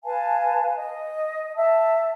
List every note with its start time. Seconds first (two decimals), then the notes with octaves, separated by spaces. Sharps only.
0.04 B4 F5 G#5 A5
0.77 D#5
1.56 E5 A5